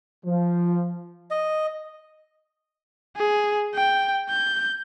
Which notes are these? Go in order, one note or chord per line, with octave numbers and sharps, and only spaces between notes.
F3
D#5
G#4
G5
G6